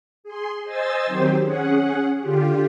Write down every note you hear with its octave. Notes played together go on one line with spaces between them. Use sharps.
G#4 C6
C5 D#5 G#5 E6 A6
D#3 F#3 C4 G4 C5
C#4 G#4 F#5
D3 F4 G4